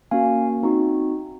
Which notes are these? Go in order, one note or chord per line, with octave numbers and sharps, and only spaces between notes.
A#3 C#4 F#4 F5 G#5
C4 D#4 F#4